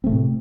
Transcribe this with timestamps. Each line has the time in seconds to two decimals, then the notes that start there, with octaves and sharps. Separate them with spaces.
0.04 C4
0.06 A3
0.09 C3
0.12 A2